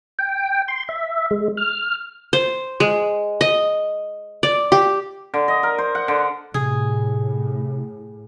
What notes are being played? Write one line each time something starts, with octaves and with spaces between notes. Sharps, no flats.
G5
C6
E5
G#3
F6
C5
G#3
D#5
D5
G4
D3
D#5
A#4
C5
F#5
D3
A2 C3 G#4